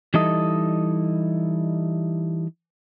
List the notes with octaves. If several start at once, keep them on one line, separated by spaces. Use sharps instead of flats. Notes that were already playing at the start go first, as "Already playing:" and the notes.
E3 G3 D#4 E4 A4 D#5